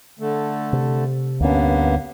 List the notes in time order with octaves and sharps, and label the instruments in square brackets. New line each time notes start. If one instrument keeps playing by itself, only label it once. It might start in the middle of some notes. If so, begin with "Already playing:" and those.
[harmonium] D3 A3
[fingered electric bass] C3
[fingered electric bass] D2 C#4 [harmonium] G2 A#3 B3